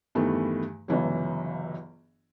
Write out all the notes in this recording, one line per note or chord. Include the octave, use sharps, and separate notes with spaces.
E2 G2 D#3 E3 A3
G1 C#2 E3 F#3